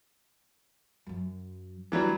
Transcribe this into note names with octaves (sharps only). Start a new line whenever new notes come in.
F#2 F#3
D2 E3 F#3 G3 D4